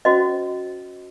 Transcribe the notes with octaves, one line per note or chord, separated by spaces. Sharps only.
C#4 F#4 C5 D#5